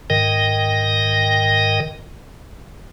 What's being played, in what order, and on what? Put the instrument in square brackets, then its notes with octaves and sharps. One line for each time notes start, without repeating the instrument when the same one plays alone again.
[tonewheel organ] G#2 D#3 A#4 D#5 G5